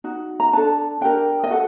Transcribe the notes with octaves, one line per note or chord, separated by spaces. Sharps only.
D#4 F#4
A#5
D4 A4 A5
D4 G4 A#4 G5
D#5
F#4 A4 F#5